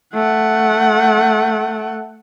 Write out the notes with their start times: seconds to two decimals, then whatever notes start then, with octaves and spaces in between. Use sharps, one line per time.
0.14 A3 F#5